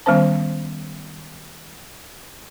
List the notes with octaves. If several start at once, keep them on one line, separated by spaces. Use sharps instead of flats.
D#3 G3 B3 C#4 C5 A5